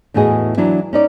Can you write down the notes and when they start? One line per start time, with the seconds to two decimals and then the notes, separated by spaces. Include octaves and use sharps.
0.14 E2 A2 E3 F#4 G#4 D#5
0.57 E3 F#3 D4 E4
0.93 C#4 D#4 D5